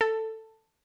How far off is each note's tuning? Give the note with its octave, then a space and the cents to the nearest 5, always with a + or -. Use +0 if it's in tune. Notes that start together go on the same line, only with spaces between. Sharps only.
A4 +10